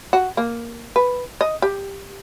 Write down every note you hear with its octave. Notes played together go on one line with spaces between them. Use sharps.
F#4
A#3
B4
D#5
G4